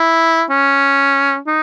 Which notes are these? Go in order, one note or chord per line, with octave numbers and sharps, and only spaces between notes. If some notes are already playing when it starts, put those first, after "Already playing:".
Already playing: E4
C#4
D#4